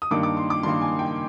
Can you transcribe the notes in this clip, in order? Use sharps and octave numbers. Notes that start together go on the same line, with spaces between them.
D#6
G2 D#3 A#3 D6
D6
C6
D6
G2 D#3 A#3 C6
G#5
G5